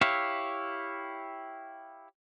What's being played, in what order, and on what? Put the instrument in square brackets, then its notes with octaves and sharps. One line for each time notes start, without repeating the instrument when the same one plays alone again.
[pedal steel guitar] E4 G4 C#5 E5 F5